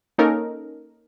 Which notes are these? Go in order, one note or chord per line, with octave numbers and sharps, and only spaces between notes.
A#3 C#4 D#4 A4 A#4